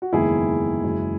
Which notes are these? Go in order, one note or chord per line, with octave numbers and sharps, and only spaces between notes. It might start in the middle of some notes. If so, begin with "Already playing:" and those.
F#4
F#1 E2 D#3 G#3 E4 G#4
F#1 F#2 E3 G#3